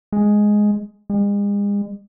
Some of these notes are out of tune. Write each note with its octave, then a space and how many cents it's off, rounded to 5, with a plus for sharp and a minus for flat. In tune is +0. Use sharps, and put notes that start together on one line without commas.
G#3 +5
G#3 -40